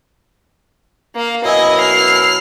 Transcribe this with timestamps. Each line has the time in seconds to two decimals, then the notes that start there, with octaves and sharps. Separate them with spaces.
1.15 A#3 F5
1.44 F#2 B2 E4 D#5 G#5
1.79 F6 C7